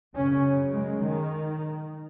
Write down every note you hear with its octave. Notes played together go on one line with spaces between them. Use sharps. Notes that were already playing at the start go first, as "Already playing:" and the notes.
F#2 C#3 C#4
G#3
D#3